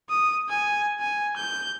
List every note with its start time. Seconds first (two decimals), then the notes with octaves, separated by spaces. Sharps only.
0.10 D#6
0.49 G#5
1.00 G#5
1.37 G6